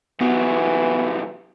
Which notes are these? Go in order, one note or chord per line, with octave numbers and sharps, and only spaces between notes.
C2 E3 F#3 B3